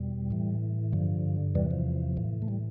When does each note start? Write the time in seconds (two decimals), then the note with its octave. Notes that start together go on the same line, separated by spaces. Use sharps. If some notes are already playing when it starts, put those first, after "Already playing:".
Already playing: E2 B2 G3
0.31 A2 E3
0.92 G2 D3 F3
1.55 E2 C3 E3 G3
1.71 F3
2.17 A2 E3
2.42 A3
2.48 G3